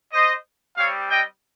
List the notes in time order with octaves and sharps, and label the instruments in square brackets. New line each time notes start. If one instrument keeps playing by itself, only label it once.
[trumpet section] C5 D#5
G3 C4 G4 C#5 F5
D#5 G5